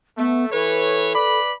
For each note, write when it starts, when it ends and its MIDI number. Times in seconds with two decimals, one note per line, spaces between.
0.18 0.52 57
0.18 0.46 59
0.52 1.12 52
0.52 1.40 69
0.52 1.12 71
0.52 1.12 73
1.14 1.52 71
1.14 1.52 74
1.14 1.52 83